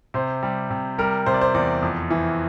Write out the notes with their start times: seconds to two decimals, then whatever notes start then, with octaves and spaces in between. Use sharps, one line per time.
0.14 C3 C5
0.43 G3
0.70 C3
0.98 G3 A#4
1.26 C3 C5
1.34 D5
1.41 C5
1.54 E2 D5
1.82 F2
2.10 E3